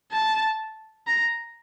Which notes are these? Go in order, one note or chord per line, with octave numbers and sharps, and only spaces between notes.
A5
A#5